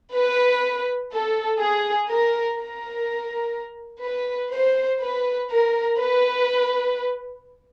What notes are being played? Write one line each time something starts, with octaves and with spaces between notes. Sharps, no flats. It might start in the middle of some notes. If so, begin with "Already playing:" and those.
B4
A4
G#4
A#4
A#4
B4
C5
B4
A#4
B4